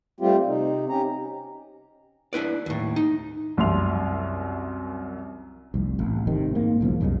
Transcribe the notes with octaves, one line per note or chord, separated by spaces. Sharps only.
G3 A3 C4 F4 G4
C3 D#4
C#4 G4 A#5
D4 E4 B4 D5
D#2 A2
D#4
C2 F#2 E5 C6 F7
F1 C2
A1
G#2 C3 D#3
G#2 A#3
B1 E2 C#3 F3
C2 F#2 C#3 G#3